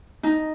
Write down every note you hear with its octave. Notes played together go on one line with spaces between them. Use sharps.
D#4